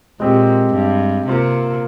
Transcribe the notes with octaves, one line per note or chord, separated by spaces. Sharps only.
A#2 G#3 C4 G4
G2
C3 A#3 F4 C5